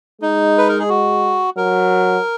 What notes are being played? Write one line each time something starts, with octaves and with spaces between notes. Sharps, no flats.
G#3 D#4
B4
A#4
G#4
F#4
F#3 A#4